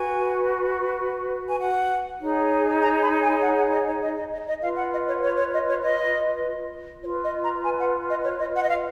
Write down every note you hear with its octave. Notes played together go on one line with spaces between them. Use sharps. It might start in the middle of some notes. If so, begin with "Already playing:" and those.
Already playing: F#4 B4 G#5
G#5
F#5
D#4 G#4 C#5
A#5
B5
G#5
F#5
F#5
D#5
C#5
D#5
D#5
D#5
D#5
F4 B4 F5
F#5
D#5
C#5
C#5
C#5
D#5
C#5
D#5
F4 B4 C#5
D#5
A#5
G#5
F#5
D#5
C#5
D#5
F#5
D#5
F5